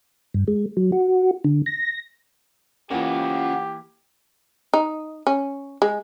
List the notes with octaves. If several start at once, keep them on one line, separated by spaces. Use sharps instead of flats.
G2
G#3
F#3
F#4
D3
A#6
C#3 E3 A#3 F4 G4 C5 F#5
D#4
C#4
G#3